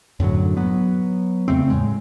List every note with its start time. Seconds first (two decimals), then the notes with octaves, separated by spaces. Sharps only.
0.20 F#2 A2 D3 F#3
0.57 F#3 B3
1.48 E2 C#3 A3 C4
1.70 A2 G#3